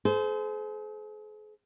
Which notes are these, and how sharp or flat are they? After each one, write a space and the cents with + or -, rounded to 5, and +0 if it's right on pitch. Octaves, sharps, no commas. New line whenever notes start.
G#4 +45 C5 -25